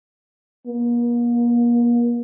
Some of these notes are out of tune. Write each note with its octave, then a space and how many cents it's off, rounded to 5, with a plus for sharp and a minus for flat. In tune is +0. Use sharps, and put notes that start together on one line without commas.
A#3 +40